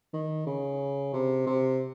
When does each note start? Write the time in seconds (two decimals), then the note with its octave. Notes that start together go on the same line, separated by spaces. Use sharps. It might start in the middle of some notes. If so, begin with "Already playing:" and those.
0.13 D#3
0.46 C#3
1.14 C3
1.46 C3